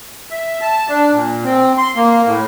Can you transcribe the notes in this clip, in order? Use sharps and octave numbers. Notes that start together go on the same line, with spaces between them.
E5
A5
D4
A#2
C4
C6
A#3
A2